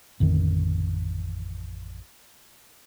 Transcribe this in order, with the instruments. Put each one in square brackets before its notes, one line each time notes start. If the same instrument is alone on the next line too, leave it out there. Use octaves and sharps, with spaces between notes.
[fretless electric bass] A1 F2 D3 D#3